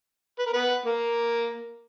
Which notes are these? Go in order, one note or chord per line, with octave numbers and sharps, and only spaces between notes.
B4
A#4
B3 B4
A#3 A#4